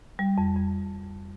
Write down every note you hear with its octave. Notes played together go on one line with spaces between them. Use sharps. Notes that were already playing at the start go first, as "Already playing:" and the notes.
G3
F2
F2